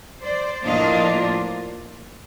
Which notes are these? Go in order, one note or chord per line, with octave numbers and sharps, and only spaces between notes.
C5 D5
A2 F3 A#3 D4 F4 D#5 F5